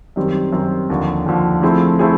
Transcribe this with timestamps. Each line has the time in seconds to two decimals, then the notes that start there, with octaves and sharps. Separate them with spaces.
0.16 F#2 D#3 G3 C4
0.53 F#2 D#3 G3 C4
0.90 D#2 D3 F3
1.26 D#2 D3 F3
1.62 F3 A3 C4 E4 G#4
1.99 F3 A3 C4 E4 G#4